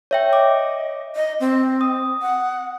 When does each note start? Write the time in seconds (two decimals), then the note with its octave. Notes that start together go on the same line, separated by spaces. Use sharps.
0.11 C#5 E5 G5
0.33 D#5 D6
1.15 D#5
1.40 C4
1.81 D#6
2.22 F#5